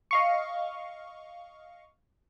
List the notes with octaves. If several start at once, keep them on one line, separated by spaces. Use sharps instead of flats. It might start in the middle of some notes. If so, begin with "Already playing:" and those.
D#5 F5 C#6